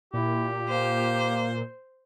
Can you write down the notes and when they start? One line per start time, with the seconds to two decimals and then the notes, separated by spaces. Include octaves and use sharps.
0.14 A#2 E4 G4
0.69 A#3 C5